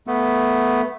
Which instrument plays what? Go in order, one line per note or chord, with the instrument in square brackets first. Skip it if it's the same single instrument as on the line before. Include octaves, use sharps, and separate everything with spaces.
[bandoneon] A3 B3